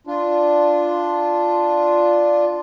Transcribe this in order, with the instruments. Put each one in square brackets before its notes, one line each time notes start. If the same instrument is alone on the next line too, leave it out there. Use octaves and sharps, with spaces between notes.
[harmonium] D4 F4